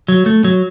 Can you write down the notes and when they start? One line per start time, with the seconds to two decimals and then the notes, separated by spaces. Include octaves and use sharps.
0.08 F#3
0.26 A3
0.44 F#3